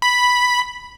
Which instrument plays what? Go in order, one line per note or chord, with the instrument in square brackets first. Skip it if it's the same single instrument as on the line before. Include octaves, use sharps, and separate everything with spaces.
[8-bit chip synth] B5